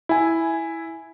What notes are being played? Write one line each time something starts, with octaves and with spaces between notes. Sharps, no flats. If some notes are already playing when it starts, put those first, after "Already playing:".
E4 G#5